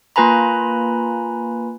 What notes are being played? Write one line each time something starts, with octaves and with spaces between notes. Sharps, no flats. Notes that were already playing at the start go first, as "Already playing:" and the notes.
A#3 F4 B4 G#5 A#5 B5